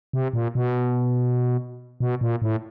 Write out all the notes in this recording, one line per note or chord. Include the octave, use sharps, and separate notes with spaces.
C3
A#2
B2
B2
A#2
A2